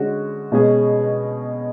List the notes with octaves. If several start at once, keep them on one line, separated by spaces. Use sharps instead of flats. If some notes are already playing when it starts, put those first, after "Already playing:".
Already playing: D3 G#3 C#4 F#4
B2 G#3 C#4 G#4